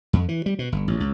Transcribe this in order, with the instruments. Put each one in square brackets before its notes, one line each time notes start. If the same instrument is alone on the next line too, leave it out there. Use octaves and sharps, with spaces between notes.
[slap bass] F2
E3
G3
B2
G1
A1
C#2